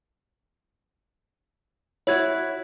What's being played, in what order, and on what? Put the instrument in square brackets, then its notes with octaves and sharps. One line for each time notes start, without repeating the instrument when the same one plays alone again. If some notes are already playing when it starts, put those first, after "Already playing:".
[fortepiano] E4 F#4 [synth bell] C#5 G#6